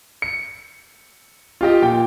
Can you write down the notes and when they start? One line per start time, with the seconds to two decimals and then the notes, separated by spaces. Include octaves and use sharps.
0.22 C#7
1.61 F4 G4 D#5
1.82 A#2 G5